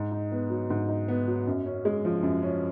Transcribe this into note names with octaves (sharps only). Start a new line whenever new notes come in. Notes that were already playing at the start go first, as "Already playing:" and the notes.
Already playing: G#2
D#4
B3
F#3
G#2
D#4
B3
F#3
F#2
C#4
G#3
F3
F#2
C#4